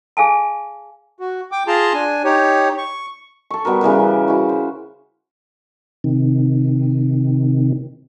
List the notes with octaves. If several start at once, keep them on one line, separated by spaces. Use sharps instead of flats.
G#4 F5 G#5 A5
F#4
G5 D6
F4 G#4 A5 A#5 C6
D4 G#5
D#4 G4 C#5
C#6
A4 C#6
G3 B3 F#4 A#4
C#3 E3 G3 A#4
E4 F#4
C5
C3 D#3